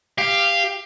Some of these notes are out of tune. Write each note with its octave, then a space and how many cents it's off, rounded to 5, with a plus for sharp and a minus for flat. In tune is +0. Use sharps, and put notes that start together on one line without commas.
G4 +15 F5 -10